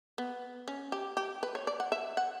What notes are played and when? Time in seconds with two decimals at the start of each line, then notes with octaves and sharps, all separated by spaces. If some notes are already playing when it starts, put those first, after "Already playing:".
0.18 B3
0.68 C#4
0.92 G4
1.17 G4
1.43 B4
1.55 C#5
1.67 D5
1.80 F#5
1.92 E5
2.17 F#5